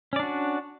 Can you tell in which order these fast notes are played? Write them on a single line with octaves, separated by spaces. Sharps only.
C#4 D5 D4 F#4